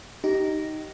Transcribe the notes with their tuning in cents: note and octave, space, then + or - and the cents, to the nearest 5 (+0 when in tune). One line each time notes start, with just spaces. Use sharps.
D#4 +0 G4 -25